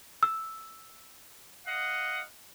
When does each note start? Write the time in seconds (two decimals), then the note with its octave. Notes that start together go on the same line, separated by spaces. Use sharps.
0.23 E6
1.66 D#5 F5 F#5